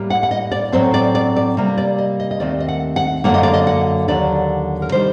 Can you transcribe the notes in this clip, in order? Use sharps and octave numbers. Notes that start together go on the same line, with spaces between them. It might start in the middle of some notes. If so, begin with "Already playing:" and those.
Already playing: A2 G3 A#3
F#5
F#5
D#5
D5
A2 F#3 C4 C5
D5
D5
D5
C3 G3 A#3
D5
D#5
D#5
D#5
D#2 D#3 A3 C4 D5
D#5
F#5
F#5
F#2 D3 F#3 A#3 F#5
D#5
D5
D#5
F#5
D#2 D3 F#3 D5
A#4
C3 D#3 G3 C5